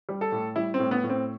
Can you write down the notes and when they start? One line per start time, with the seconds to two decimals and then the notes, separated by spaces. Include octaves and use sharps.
0.09 G3
0.21 A4
0.32 A2
0.56 G3 E4
0.74 C4
0.79 A2
0.91 B3
1.04 A2
1.10 C4